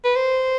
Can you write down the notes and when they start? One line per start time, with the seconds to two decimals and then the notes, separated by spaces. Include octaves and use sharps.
0.04 B4
0.16 C5